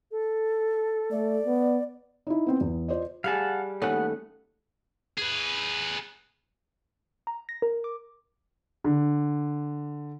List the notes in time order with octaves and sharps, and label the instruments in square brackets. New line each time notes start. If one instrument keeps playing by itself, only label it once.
[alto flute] A4
[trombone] A3 [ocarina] D5
[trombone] B3
[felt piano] D#4 E4
B3 C4
E2
F4 C5 D5 D#5
[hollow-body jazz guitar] G3 G#4 G#5 [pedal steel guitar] F5 F#5 A5
[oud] D#2 A3 C#4 [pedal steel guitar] B3 F#5
[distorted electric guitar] G#4 B4
[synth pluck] A#5
A#6
A#4
D6
[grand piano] D3